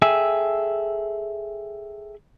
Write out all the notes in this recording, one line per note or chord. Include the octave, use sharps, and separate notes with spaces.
G#4 A4 E5 G5 G#5